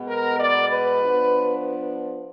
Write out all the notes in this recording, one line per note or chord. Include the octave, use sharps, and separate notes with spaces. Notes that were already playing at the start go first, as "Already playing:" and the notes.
Already playing: B2 G#3 B3
A#4
D5
B4
F3 B3 D4